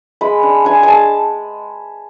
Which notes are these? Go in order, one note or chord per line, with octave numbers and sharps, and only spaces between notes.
G#3 B5
D4
D4 G#5
G#3 G#5 A5